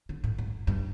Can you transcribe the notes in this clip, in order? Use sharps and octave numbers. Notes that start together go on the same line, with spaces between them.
D3
A2
G#2
G2